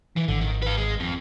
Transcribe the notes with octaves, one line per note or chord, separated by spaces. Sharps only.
E3
G#1 D3
D#3
B4 F5
G#3
F2